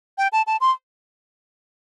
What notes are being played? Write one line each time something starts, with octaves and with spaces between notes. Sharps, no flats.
G5
A5
A5
C6